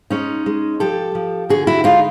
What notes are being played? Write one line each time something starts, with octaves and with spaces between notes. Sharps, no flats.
G#3 C#4 D#4
G#3
F3 G4 A4
F3
D3 F#4 G#4
E4 F#4
G#3 D#4 F4